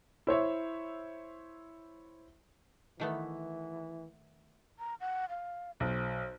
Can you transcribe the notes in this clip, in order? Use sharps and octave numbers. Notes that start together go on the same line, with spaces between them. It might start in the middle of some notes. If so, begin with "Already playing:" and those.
E4 C5 C#5 E5
D#3 E3 A3 B3
A#5
F#5
F5
B1 C5